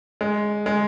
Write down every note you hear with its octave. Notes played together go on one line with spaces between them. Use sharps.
G#3
G#3